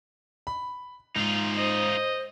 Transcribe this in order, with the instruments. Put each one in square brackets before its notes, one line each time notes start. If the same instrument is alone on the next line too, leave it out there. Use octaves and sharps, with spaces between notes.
[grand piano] B5
[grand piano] G#2 [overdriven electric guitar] D#4 F4
[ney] C5 [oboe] D#5